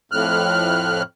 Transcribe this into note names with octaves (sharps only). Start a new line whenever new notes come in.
F2 A2 F6 F#6